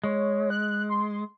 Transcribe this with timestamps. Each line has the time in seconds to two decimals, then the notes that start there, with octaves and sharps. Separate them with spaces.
0.03 G#3 C#5
0.50 F#6
0.89 C6